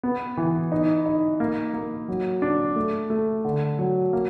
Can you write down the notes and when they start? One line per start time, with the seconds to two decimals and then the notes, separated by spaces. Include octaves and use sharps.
0.03 B3
0.37 E3
0.72 D#4
1.06 D#4
1.40 A#3
1.74 A#3
2.08 F#3
2.42 D4
2.76 A3
3.10 A3
3.45 D3
3.79 F#3
4.13 A#3